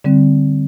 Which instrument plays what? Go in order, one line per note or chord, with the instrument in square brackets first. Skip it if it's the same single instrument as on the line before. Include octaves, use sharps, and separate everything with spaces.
[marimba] D3 G3 C4